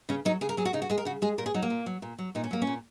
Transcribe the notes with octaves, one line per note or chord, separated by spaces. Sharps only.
C#3 C#4
F#3 D#4
C#3 G#4
A#4
F#3 G#4
F#4
C#3 D#4
F#4
G#3 G#4
A#4
C#3 F#4
G#3 G#4
A#2 A#4
G#4
F#3 D#4
A#3
A#2
F#3
A#2
F#3
A#2 D#4
C#4
F#3 A#3
C#4
A#2